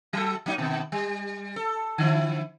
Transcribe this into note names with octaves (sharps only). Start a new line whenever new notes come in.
F#3 A4
F#3 A#3 D#4
B2 D#3 B3
G3
A4
D3 F3 E4